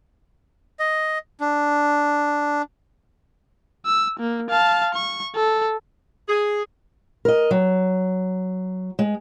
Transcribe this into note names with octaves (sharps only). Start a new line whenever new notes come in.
D#5
D4
E6
A#3
F5 A5
C#6
A4
G#4
A#4 D#5
F#3
G#3